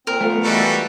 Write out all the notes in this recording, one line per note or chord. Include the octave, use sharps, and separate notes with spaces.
A#2 C4 A#4
F3 A3 B3 F4
E3 G3 G#3 F#4 A4